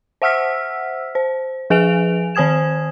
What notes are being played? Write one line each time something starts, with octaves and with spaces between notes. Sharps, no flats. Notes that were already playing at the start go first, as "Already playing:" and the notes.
C5 E5 F#5 E6 F6 B6
C5
F3 G#4 B4 G#5 D7 F7
D#3 C5 G#5 D#6 G#6 E7